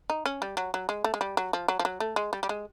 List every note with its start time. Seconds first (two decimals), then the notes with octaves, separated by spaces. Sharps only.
0.10 D#4
0.26 C#4
0.42 G3
0.57 F#3
0.74 F#3
0.89 G#3
1.04 A3
1.14 G#3
1.21 G3
1.37 F#3
1.53 F3
1.68 F#3
1.79 F3
1.85 F#3
2.00 A3
2.16 G#3
2.33 G3
2.43 G3
2.49 G#3